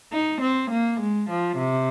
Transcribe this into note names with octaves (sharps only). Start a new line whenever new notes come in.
D#4
C4
A#3
G#3
F3
C3